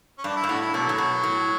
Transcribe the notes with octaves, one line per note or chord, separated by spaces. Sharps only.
C#4
G2 D4
E4
G2
A2 F#4
E4
B2 D3 F#3
A2
B2
A2